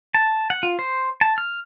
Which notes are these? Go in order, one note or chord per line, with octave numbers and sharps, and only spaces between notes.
A5
F#5
F4
C5
A5
F6